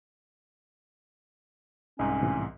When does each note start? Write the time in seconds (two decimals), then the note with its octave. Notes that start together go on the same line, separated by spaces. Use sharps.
1.99 C2 G#2 C#4 D#4
2.22 A2 C3 E3